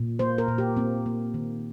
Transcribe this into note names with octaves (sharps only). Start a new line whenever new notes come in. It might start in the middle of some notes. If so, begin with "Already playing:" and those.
Already playing: A#2
A#3 C5
A#4
A#2
G4
A#3 C4
A#3
D#3